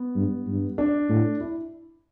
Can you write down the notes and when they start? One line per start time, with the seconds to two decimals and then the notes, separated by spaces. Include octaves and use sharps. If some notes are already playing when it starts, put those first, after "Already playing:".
Already playing: B3
0.15 G2
0.46 G2
0.78 D4
1.09 A2
1.41 E4